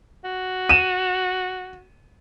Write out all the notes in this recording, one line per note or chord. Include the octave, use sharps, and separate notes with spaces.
F#4
D#7 E7